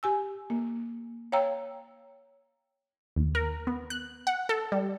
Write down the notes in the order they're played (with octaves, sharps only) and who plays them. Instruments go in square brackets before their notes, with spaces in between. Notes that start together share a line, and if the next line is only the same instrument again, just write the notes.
[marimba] G4 G#5 E6
A#3
C#5 F5 G5 A#5 E6
[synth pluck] D#2
A#4
B3
F#6
F#5
A4
G3